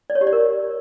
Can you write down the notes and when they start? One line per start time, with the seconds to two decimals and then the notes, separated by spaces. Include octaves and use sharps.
0.10 D5
0.15 C#5
0.21 G4
0.27 D5
0.33 A#4